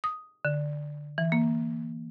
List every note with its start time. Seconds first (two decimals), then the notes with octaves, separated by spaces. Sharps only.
0.04 D#6
0.45 D3
1.18 E3
1.32 A#3